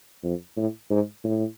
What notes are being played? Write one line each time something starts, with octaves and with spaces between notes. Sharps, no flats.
F2
A2
G#2
A2